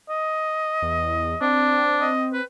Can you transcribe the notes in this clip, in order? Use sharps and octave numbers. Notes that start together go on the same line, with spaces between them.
D#5
E2
C4 D4
D#5
B4